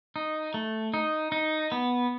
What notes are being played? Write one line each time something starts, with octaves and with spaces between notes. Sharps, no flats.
D#4
A3
D#4
D#4
B3